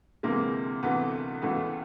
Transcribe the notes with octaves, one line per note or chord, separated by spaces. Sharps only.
D2 C3 E3 G#3 A#3
D2 C3 E3 A3 B3
C#2 C#3 E3 A3 B3